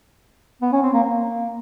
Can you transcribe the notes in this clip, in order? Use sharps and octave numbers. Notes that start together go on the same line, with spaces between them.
B3
C#4
C4
A#3
A#3